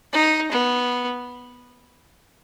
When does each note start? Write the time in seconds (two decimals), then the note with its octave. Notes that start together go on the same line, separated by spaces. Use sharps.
0.13 D#4
0.52 B3